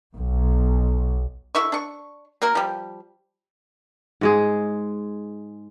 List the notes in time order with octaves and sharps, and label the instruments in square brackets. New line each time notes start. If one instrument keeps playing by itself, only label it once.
[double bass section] B1
[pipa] D3 E4 E5 C#6
D4 C#6
A#3 F#4 A#4
F3 G3
[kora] G#2 G#3 G#4